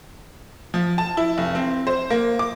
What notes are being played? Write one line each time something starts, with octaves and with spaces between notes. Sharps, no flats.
F3
A5
E4
F1
C4
C5
A#3
D6